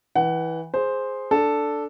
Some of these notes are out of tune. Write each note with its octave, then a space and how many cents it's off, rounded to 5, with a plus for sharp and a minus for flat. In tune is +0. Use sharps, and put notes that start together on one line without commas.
E3 -15 F#5 +25
G#4 +0 C5 +0
D4 +0 A4 +0